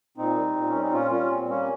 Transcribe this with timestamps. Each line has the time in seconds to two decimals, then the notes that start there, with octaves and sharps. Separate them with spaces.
0.17 A#2 C4 D#4
0.36 G3
0.56 A#2
0.69 G3 C#4
0.81 D#4
0.92 A#2 C#4 F4
1.11 G3 C#4 F4
1.30 A#2 C4
1.49 G3 A#3 C#4